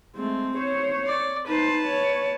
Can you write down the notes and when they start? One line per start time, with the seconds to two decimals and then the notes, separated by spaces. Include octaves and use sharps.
0.16 G#3 A3 C4
0.57 C5 C#5
1.06 D5
1.48 D#4 B4 C5 A5
1.86 C#5